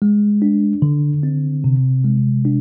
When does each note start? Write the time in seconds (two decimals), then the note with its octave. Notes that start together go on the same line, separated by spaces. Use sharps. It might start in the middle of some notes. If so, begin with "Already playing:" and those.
0.02 G#3
0.42 D4
0.82 D3
1.23 C4
1.64 C3
2.04 G#3
2.45 D4